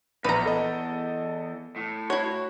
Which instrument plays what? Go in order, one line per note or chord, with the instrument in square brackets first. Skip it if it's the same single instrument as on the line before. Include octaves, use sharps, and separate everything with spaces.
[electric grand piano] A#1 [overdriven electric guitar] E2 [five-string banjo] B4 A#5
[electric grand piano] A4 D#5
[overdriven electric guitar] A2
[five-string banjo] E4 C#5 [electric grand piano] F#4